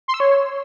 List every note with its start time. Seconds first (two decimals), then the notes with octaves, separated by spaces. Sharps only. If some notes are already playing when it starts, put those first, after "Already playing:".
0.08 C6
0.14 E6
0.20 C#5